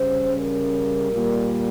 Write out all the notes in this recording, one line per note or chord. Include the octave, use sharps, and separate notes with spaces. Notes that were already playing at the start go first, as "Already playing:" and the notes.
Already playing: C#3 G3 C#4 C5
A#4
A#2 G3 A#3